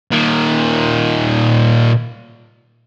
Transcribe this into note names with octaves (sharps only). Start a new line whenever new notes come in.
A#2 D#3